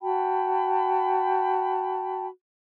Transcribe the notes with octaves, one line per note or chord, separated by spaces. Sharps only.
F#4 G5 A5 B5